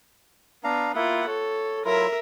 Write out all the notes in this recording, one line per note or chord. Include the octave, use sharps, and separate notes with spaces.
B3 D4 F5 A#5
A#3 E4 F4 E5 F#5
A4 C#5
F#3 E4 F4 A#4 E5